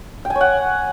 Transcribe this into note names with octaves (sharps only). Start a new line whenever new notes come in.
G5
G#5
C#5
F#5